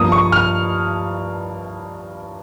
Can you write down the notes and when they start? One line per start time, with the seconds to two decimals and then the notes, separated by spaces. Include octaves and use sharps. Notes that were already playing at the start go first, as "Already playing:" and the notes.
Already playing: G2 F3 A#3 D#6
0.12 C#6
0.32 F6